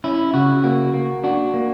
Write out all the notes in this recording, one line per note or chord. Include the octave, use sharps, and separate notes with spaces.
C#4 E4
C#3 F#4
A#3 F#4
A#3
D4 F#4
A#3